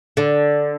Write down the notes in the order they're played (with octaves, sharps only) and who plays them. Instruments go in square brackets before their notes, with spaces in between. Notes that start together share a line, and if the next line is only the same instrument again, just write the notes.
[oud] D3